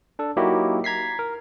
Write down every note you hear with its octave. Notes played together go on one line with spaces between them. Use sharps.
D4 A4
F#3 A#3 D#4 E4 F#4 G4
A#5 G#6 B6 C7
A#4